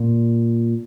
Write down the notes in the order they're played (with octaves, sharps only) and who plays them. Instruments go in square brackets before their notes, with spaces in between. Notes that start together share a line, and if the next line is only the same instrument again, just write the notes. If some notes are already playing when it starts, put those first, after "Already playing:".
Already playing: [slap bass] A#2